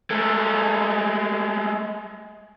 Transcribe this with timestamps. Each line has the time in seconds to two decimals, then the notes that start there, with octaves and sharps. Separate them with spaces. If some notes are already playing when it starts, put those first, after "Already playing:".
0.10 G#3 A3